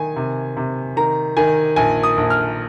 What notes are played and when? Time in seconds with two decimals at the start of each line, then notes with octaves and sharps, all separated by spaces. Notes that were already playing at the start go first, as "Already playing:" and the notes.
Already playing: D#3 G#5
0.16 C3
0.57 C3
0.97 D#3 A#5
1.37 D#3 G#5
1.76 A#1 G#5
2.03 D#6
2.18 A#1
2.30 F6